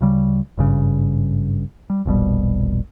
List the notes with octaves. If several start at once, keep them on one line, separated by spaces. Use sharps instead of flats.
D2 C#3 G3
G#1 G2 C#3
G3
E1 A#1 B2 G3